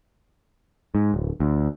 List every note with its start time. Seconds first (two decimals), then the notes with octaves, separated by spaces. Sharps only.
0.95 G#2
1.14 D1
1.40 D2